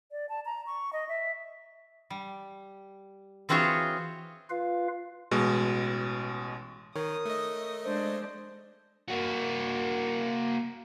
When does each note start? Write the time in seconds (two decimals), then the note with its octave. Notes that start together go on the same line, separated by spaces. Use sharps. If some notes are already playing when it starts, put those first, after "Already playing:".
0.12 D5
0.29 A5
0.45 A#5
0.66 C#6
0.93 D#5
1.09 E5
2.10 G3
3.49 E3 C4 F4 F#4 G#4 C#5
4.49 F4 B4 F5
5.31 A1 B2 G#3
6.96 D#3 A#4 C#5 D#6
7.25 A3 D#5
7.84 G#3 D4 C5
9.08 A#3 F#4